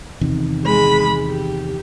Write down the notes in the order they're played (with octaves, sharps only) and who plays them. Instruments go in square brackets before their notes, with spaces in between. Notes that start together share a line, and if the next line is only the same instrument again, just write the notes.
[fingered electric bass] E2 C3 D#3
[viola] G#3 B5
G4